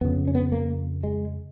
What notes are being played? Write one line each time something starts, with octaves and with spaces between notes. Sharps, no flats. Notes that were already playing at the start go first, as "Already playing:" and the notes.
F2 C#3 B3
C#4
B3
A#3
G#3